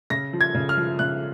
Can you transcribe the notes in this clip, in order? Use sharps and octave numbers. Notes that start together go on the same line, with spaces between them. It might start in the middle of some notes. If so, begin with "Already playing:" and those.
C#3 A#6
F3
G#6
C#3
F6
F3
C#3 F#6